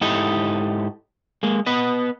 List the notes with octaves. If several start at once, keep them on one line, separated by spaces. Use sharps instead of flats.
G#2 E4 G4 A4 D#5
G#3 A#3
B3 B4 D#5